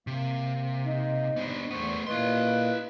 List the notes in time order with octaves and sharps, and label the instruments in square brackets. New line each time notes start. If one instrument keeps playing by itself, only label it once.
[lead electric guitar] C3 [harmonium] A#3
[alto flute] D#4
[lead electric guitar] B3 D4 [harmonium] C5 D#5
[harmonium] E2 C5 [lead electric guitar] A3 B3 [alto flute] C#6
[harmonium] A#2 A#3 D#5 [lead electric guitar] E4 C6 [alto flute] B4